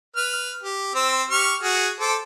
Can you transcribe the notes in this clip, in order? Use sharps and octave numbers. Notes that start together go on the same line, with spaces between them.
B4 F6
G4
C4 C5 E6
G4 C#6 F6
F#4 G#4
A4 C5 D6